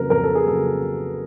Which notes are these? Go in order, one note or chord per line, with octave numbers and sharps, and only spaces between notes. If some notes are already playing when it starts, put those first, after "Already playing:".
Already playing: F2 C#3 F#3 A#3 A#4 B4
F2 A#4
A4
G#4
C#3 F#3 A#3 A4